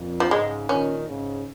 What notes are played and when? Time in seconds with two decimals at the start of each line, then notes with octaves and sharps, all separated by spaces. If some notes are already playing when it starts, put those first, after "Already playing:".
Already playing: F2 A#2
0.20 F3
0.31 G#2 C#3 G#3
0.69 A#2 D#3 C#4
1.07 G#2 C#3